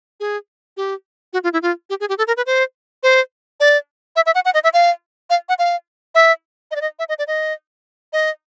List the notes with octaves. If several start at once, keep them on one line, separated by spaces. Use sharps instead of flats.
G#4
G4
F#4
F4
E4
F4
G4
G#4
G4
A4
A#4
B4
C5
C5
D5
E5
E5
F#5
F#5
D#5
E5
F5
F5
F#5
F5
E5
D#5
D5
D#5
E5
D#5
D5
D#5
D#5